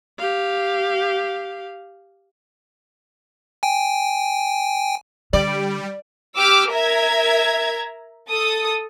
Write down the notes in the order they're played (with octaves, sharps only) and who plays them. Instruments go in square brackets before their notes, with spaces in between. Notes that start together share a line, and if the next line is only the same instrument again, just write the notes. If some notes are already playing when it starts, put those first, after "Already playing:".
[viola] G4 F5
[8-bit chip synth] G5 G#5
[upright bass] D3 [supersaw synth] G3 [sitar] D5
[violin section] G4 D6 E6 F6
A#4 E5 A#5 G#6
A4 D#6